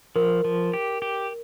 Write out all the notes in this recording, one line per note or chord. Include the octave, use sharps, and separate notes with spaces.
F3 A#4
F3
G4
G4